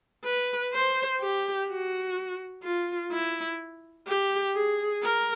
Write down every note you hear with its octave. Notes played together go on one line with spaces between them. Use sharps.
B4
C5
G4
F#4
F4
E4
G4
G#4
A#4